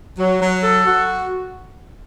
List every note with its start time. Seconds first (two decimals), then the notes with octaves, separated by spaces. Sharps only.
0.18 F#3
0.41 F#3
0.63 A4
0.87 F#4